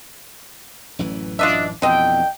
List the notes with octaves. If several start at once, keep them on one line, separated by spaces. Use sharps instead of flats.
A1 F#2 E3
D4 F4 D#5 E5
F2 B2 D3 E3 D#5 G5